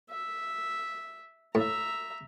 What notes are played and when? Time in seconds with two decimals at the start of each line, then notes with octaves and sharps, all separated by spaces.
0.11 E5
1.55 A2 E5 A#5